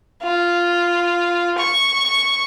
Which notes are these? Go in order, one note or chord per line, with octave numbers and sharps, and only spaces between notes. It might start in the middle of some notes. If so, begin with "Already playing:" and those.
F4
C#6